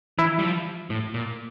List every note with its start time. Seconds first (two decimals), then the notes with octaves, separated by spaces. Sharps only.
0.18 E3 E4
0.39 G3
0.43 F3
0.90 A2
1.14 A#2